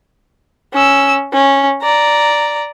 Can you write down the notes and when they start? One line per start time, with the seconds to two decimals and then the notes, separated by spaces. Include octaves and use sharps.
0.73 C#4 E6
1.33 C#4
1.83 D5 A#5